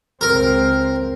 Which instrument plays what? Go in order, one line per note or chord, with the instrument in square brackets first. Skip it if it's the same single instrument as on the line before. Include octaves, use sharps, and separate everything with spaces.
[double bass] C#2 C4 [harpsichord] A#4